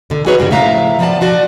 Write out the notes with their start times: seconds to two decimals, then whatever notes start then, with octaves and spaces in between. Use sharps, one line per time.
0.10 D3 D#3
0.26 D#4 F#4 G#4 B4 C#5
0.39 G2 C#3 G3 F#4
0.51 A2 C#3 F3 E5 F5 A#5
0.99 F3 B3 F4 D5 A5
1.21 F4 F#4 D5